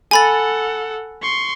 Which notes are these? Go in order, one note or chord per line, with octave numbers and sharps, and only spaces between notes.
A4 F#5 G#5 B5 A6
C6 C#6